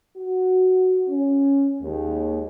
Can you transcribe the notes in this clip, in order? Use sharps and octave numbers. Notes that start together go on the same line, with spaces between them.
F#4
C#4
D#2 G#3